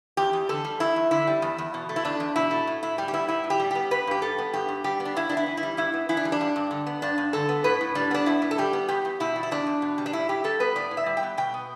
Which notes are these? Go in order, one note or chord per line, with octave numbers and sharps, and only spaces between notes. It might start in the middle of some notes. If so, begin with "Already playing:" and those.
E2 G4
E2
D3 A4
G3
E2 E4
E2
D3 E4
G3
E2
E2
B2
A3
E4
E2 D4
E2
B2 E4
A3
A2
A2 E4
G3 G4
G4
B3 E4
A2 E4
A2
G4
G3
B3 G4
G2 B4
G2 G4
G3 A4
B3
G2 G4
G2
G3 G4
B3
D4
G2 E4
B3 D4
E4
E3
E4
G3
G2 E4
B3
E3 E4
D4
G3
D4
G2
G2
D3
B3
G2 D4
G2
D3 A4
B3
A2 B4
A2
G3 D4
B3 D4
A2 E4
A2
A4
G3 G4
B3
E2 G4
E2
B2 E4
G3
E4
E2 D4
E2
B2
G3
D4
A2 E4
A2 G4
G3 A4
B3 B4
A2 D5
A2
E5
G3
G5
B3
B2 G5
B3